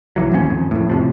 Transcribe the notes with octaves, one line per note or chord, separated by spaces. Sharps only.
B1 E3 F#3
D1 D#2 D#3 C#4
G#1 F2
F2 A2
A2 C3 F3